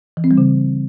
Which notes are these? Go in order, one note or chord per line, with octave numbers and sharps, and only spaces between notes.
E3
C4
G3
C#3